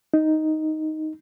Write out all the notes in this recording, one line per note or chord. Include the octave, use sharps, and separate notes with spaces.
D#4